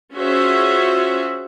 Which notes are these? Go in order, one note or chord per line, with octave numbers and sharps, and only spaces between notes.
C#4 F4 F#4 G#4 C5 E5